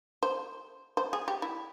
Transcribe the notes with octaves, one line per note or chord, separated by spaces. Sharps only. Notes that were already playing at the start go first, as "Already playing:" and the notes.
C5
C5
G#4
G4
E4